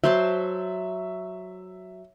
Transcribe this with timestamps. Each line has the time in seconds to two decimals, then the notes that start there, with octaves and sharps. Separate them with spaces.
0.04 F#3 C5 E5 A5